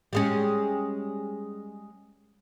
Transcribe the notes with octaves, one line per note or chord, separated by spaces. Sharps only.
G3 G#3 C#4